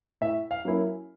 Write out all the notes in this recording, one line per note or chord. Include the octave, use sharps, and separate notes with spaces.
A2 E5
F5
F#3 A#3 C#4 E4